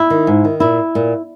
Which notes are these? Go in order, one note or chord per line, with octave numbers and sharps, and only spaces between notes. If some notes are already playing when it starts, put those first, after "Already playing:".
Already playing: E4
D#3
G#2
D#3
A#2 E4
A#2